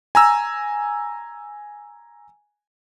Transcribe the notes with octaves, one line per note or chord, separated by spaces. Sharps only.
G#5 A#5 E6